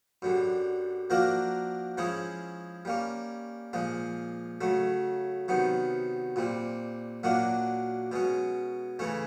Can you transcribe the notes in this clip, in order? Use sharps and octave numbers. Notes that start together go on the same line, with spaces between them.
F#2 D3 G3
F3 A#3 D4 F#4 A#4
F3 G#3 C#4 E4 G#4
G3 A#3 C#4
A#2 F3 G#3
C#3 F#3 A3
C3 D#3 F#3 B3
A#2 G3 C4
A#2 F#3 A#3 D4 F#4
B2 G#3 C#4
C#3 E3 A3 C#4